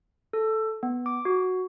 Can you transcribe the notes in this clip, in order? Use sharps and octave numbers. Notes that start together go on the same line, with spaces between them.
A4
B3
D6
F#4